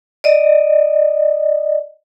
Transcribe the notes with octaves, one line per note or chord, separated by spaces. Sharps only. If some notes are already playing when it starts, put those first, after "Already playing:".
D5 D#5